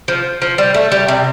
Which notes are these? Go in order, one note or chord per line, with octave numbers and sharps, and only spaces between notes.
F3
F3
G3
A3
G3
C3